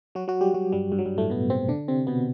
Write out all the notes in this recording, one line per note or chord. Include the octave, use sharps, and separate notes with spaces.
F#3 F#4
F#3 F#4
G3 G4
F#3 F#4
G2 G3
G2 G3
F#3
G2 G3
A2 A3
B2 B3
C3 C4
D3 D4
C3 C4
B2 B3